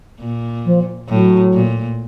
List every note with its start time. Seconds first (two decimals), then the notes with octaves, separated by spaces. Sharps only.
0.21 A#2
0.65 F3
1.09 A2 F#3
1.54 A#2